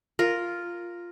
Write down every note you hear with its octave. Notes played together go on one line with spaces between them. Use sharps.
F4 A#4